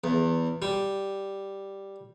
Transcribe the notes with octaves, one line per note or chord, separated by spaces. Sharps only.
E2
G3